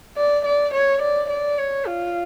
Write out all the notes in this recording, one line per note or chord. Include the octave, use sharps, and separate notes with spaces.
D5
D5
C#5
D5
D5
C#5
F4